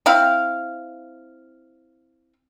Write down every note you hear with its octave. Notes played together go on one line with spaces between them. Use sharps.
C4 E4 F5